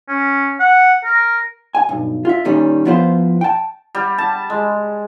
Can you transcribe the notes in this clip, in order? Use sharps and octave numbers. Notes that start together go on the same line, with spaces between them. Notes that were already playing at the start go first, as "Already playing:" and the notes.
C#4
F#5
A#4
G#5
B1 G2
F4 E5
A#2 D#3 G3 C#4
F3 B3 E4 F4 B4 C5
G5 A5
G3
A5
G#3